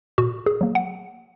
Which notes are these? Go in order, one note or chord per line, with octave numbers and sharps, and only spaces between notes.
A#2 F#4
G#4
F#3 A#3
F#5